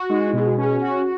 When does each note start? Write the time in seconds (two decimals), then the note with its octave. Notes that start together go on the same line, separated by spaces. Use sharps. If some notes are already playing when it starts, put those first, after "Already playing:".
Already playing: F#4
0.10 G#3 D#4
0.28 E4
0.33 B2
0.38 G#4
0.46 F#4
0.57 C#4
0.63 G#4
0.81 F#4